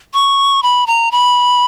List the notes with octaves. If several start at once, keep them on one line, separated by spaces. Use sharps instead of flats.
C#6
B5
A#5
B5